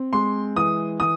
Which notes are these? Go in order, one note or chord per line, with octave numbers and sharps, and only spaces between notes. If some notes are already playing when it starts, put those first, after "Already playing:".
Already playing: C4
G#3 C6
E3 D#6
E3 D#6